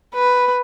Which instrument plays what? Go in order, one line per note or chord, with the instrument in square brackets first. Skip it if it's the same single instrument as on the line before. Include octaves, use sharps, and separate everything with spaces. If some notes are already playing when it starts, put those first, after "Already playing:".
[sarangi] B4